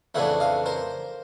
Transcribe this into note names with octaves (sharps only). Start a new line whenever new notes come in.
F2 C#3 E3 A3 D4 E5 F#5
D#5 F5
A#4 C5